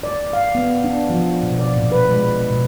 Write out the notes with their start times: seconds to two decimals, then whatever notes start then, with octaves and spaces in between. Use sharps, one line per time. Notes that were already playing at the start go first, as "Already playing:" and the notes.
0.03 D5
0.33 F5
0.55 B3
0.84 D4
1.10 F3
1.43 B2
1.59 D5
1.76 A#2
1.92 B4
2.09 G#3
2.51 B2